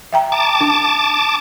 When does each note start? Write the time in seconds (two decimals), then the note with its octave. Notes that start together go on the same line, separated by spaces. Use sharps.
0.13 E5 G5 A#5
0.32 A5 D6
0.61 D4